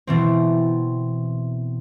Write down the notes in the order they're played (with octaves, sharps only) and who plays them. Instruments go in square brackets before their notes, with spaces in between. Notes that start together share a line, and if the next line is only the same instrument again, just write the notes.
[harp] B2 E3 C4